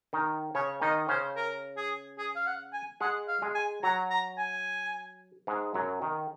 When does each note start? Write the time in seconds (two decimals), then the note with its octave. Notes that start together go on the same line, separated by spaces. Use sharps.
0.13 D#3 D#4
0.55 C#3 C#4 C#5
0.82 D#3 D#4 D#5
1.09 C#3 C#4 C5
1.36 A#4
1.77 G#4
2.18 G#4
2.36 F5
2.47 F#5
2.73 G#5
3.01 G#3 G#4 F#5
3.28 F5
3.42 G#3 G#4
3.55 G#5
3.83 F#3 F#4 A#5
4.11 A#5
4.38 G#5
5.47 G#2 G#3
5.74 F#2 F#3
6.02 D#3